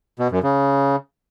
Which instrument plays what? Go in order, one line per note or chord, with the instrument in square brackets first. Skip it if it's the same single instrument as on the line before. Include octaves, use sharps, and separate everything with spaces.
[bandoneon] B2
F#2
C#3